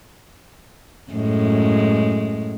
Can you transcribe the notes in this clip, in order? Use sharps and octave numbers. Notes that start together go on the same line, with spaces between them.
F#2 A2 G#3